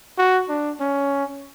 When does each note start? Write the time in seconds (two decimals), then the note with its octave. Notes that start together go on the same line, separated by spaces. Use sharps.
0.18 F#4
0.49 D4
0.80 C#4